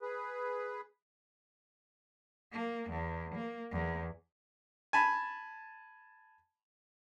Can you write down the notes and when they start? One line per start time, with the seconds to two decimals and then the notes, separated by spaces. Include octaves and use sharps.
0.02 G#4 B4
2.52 A#3
2.90 E2
3.35 A#3
3.71 E2
4.93 G#5 A5 B5